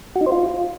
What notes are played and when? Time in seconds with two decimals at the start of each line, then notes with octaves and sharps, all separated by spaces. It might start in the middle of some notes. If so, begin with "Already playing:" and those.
0.16 F#4
0.21 D#4
0.26 C5
0.32 F4